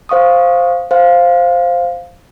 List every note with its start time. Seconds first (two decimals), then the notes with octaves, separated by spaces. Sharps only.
0.09 C5 F5 C#6 D#6
0.91 C5 F5